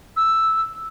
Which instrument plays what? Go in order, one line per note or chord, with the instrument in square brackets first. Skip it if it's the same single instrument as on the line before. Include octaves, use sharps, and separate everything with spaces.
[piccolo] E6